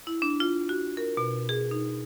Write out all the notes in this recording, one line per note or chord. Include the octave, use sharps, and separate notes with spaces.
E4
D4
F4
F#4
A#4
B2
G#4
D#4